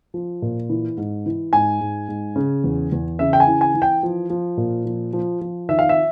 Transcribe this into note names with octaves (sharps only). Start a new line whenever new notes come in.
F3
A#2
E3
G#2
E3
G#2 G#5
G#2
G#2
C#3
E2
E2
C#3 E5
G5
G#5
E3
G#5
E3
G5
F3
F3
A#2
F3
F3
F3
D#3 E5
F5
E5